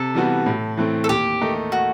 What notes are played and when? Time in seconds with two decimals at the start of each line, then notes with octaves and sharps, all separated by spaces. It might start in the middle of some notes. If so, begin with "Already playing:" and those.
Already playing: C3 A4
0.15 E3 G3 B3 F#4
0.46 A2
0.77 E3 A3 C4
1.04 A4
1.09 D#2 G4
1.41 D#3 A3 D#4
1.72 F#4